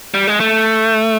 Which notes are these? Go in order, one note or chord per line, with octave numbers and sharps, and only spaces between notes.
G3
G#3
A3